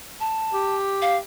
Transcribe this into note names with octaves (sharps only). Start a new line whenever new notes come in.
A5
G4
F5